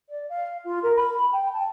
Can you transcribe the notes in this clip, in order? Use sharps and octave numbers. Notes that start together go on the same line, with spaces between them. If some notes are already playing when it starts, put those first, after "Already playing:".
D5
F5
F4
A#4
B5
G5
A5